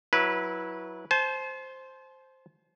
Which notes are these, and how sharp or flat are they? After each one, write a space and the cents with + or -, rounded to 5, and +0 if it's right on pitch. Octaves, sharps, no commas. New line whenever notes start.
F#3 +0 E4 +0 B4 -20
C5 +0 A5 -40